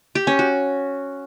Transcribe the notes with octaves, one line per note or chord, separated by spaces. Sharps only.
G4
C#4
F#4